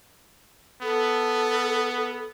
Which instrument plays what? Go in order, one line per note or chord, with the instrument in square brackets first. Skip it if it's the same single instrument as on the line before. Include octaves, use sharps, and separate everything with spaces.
[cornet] B3 [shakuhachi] A4